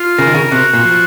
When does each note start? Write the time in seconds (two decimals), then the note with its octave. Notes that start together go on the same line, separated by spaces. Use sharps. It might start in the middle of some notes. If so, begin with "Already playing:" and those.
Already playing: F4
0.18 C#3 A#4
0.27 D#3
0.35 C#3
0.51 C3 F#4
0.73 A#2
0.85 F3